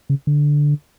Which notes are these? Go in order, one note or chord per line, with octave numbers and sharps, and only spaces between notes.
C#3
D3